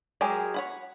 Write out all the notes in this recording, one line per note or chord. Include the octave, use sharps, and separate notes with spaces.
F#3 G#3 G4 G#4 A#4
C#5 F#5 B5